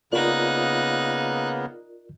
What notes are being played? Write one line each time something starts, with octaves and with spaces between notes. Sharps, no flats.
C#3 A#3 B3 D#4 F4 A#4 D5 F#6